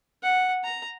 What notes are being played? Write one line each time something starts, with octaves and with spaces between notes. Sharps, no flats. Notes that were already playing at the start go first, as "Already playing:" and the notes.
F#5
A#5